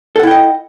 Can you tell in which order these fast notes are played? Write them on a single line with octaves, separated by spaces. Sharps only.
A4 F#5 E4 G5 D#5